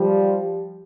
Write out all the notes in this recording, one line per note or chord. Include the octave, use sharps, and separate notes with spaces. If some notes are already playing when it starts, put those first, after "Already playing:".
Already playing: F3 G3